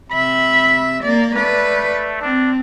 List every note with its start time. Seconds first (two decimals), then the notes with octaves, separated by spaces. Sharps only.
0.11 C3 E5 B5
1.03 A#3 D5
1.36 A3 B4 D5
2.21 C4 D4